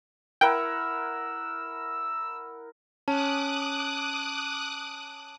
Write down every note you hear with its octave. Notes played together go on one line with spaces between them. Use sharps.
E4 A#4 F#5 G5 E6
C#4 A5 D6 D#6 F#6